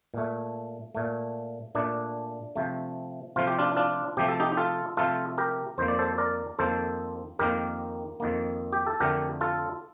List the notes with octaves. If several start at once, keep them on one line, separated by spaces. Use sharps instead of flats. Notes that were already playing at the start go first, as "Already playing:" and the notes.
A#2 A3
A#2 A3
A#2 A3 D4
C3 F3 A3
C3 F3 A3 F4
G4
D4 F4
D4 F4
C3 F3 A3 G4
A4
D#4 G4
G4
F4 A4
C3 F3 A3 F4 A4
G4 A#4
F2 D#3 A#3 C5
D5
A4 C5
A#4 D5
F2 D#3 A#3 A4 C5
F2 D#3 A#3 G4 A#4
F2 D#3 A#3
G4
A4
F2 D3 A3 G4 A#4
F4 A4